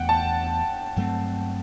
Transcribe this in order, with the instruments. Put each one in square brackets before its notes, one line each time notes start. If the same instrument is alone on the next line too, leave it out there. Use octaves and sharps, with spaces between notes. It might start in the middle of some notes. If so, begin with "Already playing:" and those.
Already playing: [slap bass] E2 B2 A3 [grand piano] F#5 G5
[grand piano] A5
[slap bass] G2 F#3 A3 C4